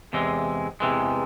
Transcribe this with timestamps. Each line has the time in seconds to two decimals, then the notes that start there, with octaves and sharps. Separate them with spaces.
0.13 E2 C3 E3 G#3
0.80 E2 C3 E3 G#3